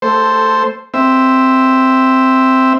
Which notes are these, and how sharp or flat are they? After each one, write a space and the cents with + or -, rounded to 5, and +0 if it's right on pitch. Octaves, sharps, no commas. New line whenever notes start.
A3 +15 A4 +0 C5 +0
C4 +0 E5 +0